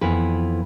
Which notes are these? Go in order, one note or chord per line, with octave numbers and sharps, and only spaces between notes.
F2 E3 B3 B4